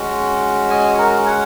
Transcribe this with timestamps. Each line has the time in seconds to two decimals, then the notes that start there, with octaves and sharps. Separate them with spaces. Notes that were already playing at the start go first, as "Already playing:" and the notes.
Already playing: G#3 C#4 F#4
0.70 D#5 G#5
0.98 F#4 A#4
1.26 C#5 F#5